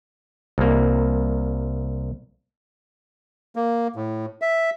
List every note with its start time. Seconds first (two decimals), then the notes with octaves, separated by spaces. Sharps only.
0.58 C2 A#3
3.56 A#3
3.96 A2
4.42 E5